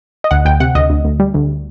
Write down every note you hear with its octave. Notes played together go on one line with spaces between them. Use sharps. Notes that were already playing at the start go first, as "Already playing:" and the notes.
D#5
D2 F#5
D2 G5
C3 F#5
D2 D#5
D2
D2
G3
D2